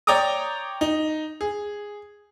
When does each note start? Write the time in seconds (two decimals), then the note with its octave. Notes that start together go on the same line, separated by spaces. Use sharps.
0.07 C#5 D5 G5 A#5 D6 D#6
0.81 D#4
1.41 G#4